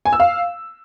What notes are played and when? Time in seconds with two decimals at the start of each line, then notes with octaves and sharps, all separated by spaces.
0.05 G#5
0.13 E6
0.20 F5